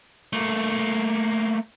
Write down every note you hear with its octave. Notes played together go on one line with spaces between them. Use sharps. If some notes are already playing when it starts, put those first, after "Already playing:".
A3 A#3